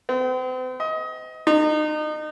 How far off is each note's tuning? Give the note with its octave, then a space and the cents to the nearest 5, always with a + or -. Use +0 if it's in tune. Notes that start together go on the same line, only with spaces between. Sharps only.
C4 -40
D#5 +25
D#4 -30